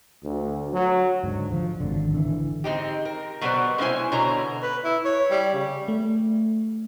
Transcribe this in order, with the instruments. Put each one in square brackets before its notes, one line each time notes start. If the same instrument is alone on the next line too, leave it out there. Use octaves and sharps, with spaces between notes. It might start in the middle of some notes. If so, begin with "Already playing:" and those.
[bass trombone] D2
F#3
[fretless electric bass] G#2 D3
F3
G#1 D3
D3 E3
[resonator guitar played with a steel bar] G#3 C4 D#4 G4
A#4
B2 F#3 G3 B3 C5 D5
G#3 C#4 D4 E4 C5 G#5
B2 D3 C#5 A#5
[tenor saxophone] B4
E4
C#5
G3
C#3
[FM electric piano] A3